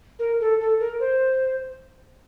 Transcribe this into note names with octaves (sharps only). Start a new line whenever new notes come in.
A#4
A4
A4
A#4
C5